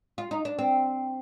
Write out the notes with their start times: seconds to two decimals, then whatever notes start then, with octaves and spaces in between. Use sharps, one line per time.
0.18 F4
0.31 D#4
0.45 D4
0.59 C4